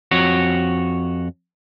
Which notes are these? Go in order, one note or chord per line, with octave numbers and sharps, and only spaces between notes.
F2 F#4 C#5